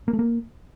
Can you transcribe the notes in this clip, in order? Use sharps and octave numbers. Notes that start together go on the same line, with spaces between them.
A#3
A3
A#3